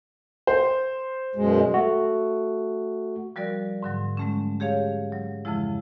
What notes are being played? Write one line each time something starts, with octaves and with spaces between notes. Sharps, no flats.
C5
F#2 B2 G#3
A3 F#4
F3 G3 F#4 A#4 D5
G#2 D3 F#3
G#3 A3 C#4
G4 G#4 C#5 F5
F#3
F2 C#3 E3 F3 G#3 E4